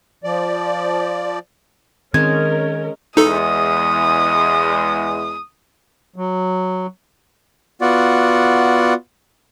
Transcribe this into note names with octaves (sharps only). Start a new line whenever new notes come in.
F3 D5
D#3 G#3 C4 C#4 A#4 G#6
E2 G#3 D#4 A4 D#6
F#3
B3 F4 F#4 D5 F#5